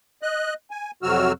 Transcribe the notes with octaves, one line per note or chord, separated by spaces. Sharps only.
D#5 F#6
G#5
F2 C3 F#3 F#4 E6 F6